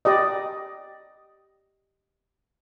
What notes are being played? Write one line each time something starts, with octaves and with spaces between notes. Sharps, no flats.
G4 D5 D#5